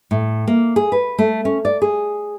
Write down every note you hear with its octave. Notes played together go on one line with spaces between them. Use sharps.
A2
A#3
G#4
B4
A3
C#4
D5
G#4